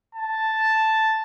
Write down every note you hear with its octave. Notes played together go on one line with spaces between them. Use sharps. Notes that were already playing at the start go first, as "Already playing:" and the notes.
A5